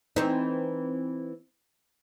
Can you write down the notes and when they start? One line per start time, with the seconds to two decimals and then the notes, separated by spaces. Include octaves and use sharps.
0.16 E3 C4 D#4